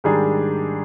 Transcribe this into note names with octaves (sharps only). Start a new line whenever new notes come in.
G#2 D#3 G3 D4 G#4